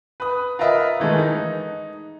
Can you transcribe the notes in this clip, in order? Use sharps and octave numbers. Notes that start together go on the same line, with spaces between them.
B4 D#6
F4 A#4 B4 D#5 E5
D#3 E3 G#3 A3
D#4